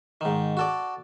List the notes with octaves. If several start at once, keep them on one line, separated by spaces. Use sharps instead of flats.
G#2 D#3
F#4 A4 D5